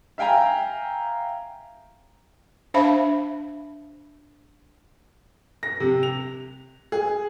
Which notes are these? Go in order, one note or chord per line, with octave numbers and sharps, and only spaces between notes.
E5 F5 G5 G#5 A#5
D4 C5 E5 F5 A5 B5
A#6
C3
F7
G#4